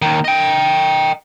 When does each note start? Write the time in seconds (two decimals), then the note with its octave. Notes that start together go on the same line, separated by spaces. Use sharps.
0.02 D#2 D#3
0.25 D#5 G5